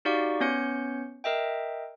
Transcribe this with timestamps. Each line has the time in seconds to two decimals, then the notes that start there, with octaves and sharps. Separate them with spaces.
0.05 D#4 F#4 G4 D5 F5 C#6
0.40 B3 C#4 C#5 G6 C#7
1.24 A#4 D#5 E5 G5